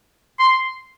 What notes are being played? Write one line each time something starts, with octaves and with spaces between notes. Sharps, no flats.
C6